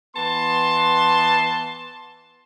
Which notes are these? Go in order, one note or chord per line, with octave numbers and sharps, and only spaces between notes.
E3 B3 A5 C6